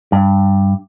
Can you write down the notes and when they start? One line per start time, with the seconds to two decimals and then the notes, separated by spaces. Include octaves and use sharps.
0.12 G2